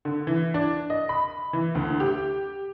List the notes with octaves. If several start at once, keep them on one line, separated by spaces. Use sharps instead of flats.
D3
E3
D4
D#5
B5
E3
D2
G4